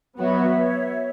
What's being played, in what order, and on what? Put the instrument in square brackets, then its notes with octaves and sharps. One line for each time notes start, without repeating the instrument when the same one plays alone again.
[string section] F#3 B3 F#4 [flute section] C#5 E5